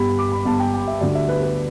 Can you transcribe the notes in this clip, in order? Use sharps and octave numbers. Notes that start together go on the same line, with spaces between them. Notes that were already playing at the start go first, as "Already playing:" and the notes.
Already playing: G1 G2 G3 B5
D6
B5
G1 G2 G3 A5
G5
G5
E5
D2 D3 G3 D5
E5
B4
B4